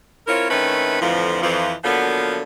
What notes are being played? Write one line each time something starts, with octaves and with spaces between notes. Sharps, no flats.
C4 E4 F4 A#4 C#5
D#3 A3 C4 C#4 E4 B4
F2 A2 D3 E3 F3
F2 E3 F3
D3 F3 F#3 A#3 B3